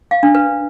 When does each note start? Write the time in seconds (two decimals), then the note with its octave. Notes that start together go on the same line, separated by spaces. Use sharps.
0.11 F5
0.23 D4
0.35 B4